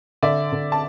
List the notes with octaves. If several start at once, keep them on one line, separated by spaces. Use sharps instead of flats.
D3 D5 E5
D3
A5